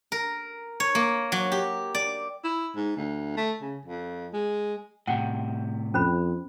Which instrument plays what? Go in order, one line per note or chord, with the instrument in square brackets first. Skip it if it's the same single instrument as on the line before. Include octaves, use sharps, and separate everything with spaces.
[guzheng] A#4
C#5
A#3
F#3
G4
D5
[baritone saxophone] E4
G#2
D2
A3
C#3
F2
G#3
[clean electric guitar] A2 C3 [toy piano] F#5 G5
[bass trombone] F2 [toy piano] C#4 C5 B5